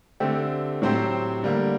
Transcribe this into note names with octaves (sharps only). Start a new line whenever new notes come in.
D3 A3 C4 G4
A2 F#3 C4 G4 C5
D3 G3 A#3